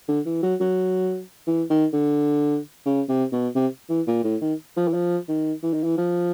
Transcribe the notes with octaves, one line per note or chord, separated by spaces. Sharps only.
D3
E3
F#3
F#3
E3
D#3
D3
C#3
C3
B2
C3
E3
A#2
A2
D#3
F3
E3
F3
D#3
E3
D#3
E3
F3